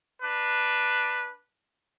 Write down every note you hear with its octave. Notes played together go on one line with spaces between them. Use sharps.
D4 B4